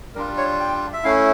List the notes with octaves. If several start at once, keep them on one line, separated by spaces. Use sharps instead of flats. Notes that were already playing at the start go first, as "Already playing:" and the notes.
G3 D4 F4 A#4
C#5
G5
E5
A3 C#4 E4 F5